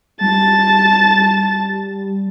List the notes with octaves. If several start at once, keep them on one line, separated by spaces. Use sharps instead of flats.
G3 A5 A6